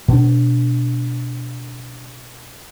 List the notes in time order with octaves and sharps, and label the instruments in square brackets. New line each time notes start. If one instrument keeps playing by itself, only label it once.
[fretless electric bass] B2 D4